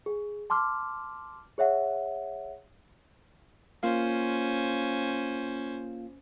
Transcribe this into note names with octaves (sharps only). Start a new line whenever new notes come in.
G#4
A5 C6 D6 F6
G#4 C#5 E5 F#5
A#3 C#4 F4 C5 F5